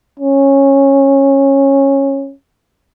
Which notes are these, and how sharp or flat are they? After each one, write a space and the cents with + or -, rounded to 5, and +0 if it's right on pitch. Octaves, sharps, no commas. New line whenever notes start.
C#4 -15